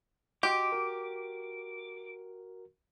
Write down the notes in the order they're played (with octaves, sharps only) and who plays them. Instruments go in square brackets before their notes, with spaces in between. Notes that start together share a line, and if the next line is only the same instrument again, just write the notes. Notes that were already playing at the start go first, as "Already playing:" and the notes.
[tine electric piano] F#4 D#5 C6 [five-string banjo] G4 [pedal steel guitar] D6
[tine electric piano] F#4 A#4